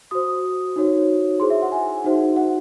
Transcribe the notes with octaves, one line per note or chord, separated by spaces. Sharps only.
F#4 C5 D#6
D#4 F#4 C#5
E4 G#4 C5 C6
E5
F#5
G#5
D#4 F#4 C5
F#5